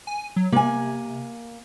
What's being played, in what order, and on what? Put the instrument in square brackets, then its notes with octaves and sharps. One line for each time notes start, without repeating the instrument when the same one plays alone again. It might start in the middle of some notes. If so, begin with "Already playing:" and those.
[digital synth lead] G#5
F#3
[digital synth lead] C3 [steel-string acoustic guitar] A#3 G#5